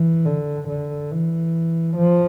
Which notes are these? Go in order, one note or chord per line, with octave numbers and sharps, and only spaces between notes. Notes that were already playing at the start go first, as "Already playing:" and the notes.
Already playing: E3
D3
D3
E3
F3